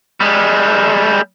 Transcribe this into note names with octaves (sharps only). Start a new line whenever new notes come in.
G3 G#3